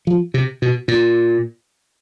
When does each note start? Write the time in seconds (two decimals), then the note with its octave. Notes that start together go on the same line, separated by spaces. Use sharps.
0.07 F3
0.34 C3
0.62 B2
0.88 A#2